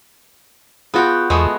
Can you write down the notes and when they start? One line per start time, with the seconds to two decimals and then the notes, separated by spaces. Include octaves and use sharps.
0.94 B3 F4 F#4 G#4 G5
1.30 E2 G#3 A3 B3 C#6 E6